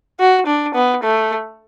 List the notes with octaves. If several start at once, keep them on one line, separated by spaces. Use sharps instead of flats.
F#4
D4
B3
A3